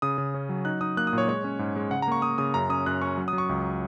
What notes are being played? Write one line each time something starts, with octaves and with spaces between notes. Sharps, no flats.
C#3 D#6
C#3
C#4
F#3
D#4 F#6
D#4 D#6
A#3 F#6
D#6
A#2 C#5
G#3 C#5
C#4
G#2
G#3
C#3 F#5
A#5
A#3 C#6
A#3 D#6
C#3 D#6
F#2 A#5
C#4 D#6
F#2 F#6
C#4 C#6
F#3
D#6
F#3
C#6
C#2